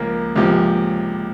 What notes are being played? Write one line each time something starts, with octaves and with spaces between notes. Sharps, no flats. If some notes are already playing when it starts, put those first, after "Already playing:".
Already playing: C#2 F3 G#3 A#3
C#2 C3 F3